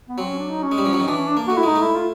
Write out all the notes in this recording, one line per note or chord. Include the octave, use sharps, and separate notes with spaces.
B3
F#3 C4
C#4
D4
D#4
C#4
G#3
G3
F3
F#3
D#3
E3 D4
C#4
D4
A#3
A3 F#4
E4
G#3 D#4
A3
E4
F4